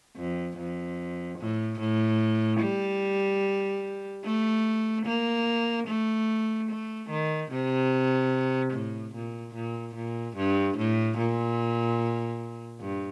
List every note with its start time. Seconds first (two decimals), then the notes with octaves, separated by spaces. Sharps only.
0.16 F2
0.57 F2
1.39 A2
1.80 A2
2.61 G3
4.24 A3
5.06 A#3
5.87 A3
6.69 A3
7.10 D#3
7.51 C3
8.73 A2
9.14 A#2
9.55 A#2
9.95 A#2
10.37 G2
10.78 A2
11.18 A#2
12.81 G2